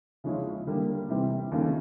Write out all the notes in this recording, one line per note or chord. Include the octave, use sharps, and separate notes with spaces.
C#3 F3 G#3 C#4 E4
D3 G3 A#3
C3 E3 G3 C4
D#2 C#3 F3 A3 C#4